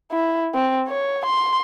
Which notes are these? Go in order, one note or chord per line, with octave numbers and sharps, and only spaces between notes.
E4
C4
C#5
C6